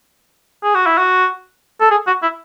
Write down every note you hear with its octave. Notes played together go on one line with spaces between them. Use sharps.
G#4
F#4
E4
F#4
A4
G#4
F#4
E4